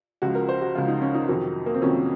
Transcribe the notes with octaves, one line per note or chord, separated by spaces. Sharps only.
C#2 C#3 F3 F#4
A#4
C5
F#4
C#2 C#3 F3 F4
D#4
C#4
D#4
F2 C3 D#3 F#3
A#3
C4
F2 C3 D#3 F#3 C#4